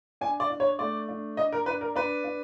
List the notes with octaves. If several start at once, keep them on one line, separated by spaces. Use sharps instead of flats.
D4 G#5
D5
D4
C#5
A3 D5
D4
D4 D#5
A#4
D4 B4
A#4
D4 B4
D4